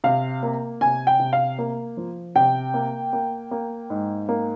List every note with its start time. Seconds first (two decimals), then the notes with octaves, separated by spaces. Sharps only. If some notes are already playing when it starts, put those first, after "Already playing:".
0.04 C3 F5
0.43 A#3
0.81 C3 G#5
1.07 G5
1.20 C3
1.33 F5
1.59 A#3
1.97 F3
2.35 C3 G5
2.74 A#3
3.13 A#3
3.51 A#3
3.90 G#2
4.29 A#3